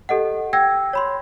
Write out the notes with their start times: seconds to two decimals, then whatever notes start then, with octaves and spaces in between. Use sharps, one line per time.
0.09 G4 A4 D#5 F#5
0.53 G5 E6 G#6 A#6
0.93 C#5 B5 C6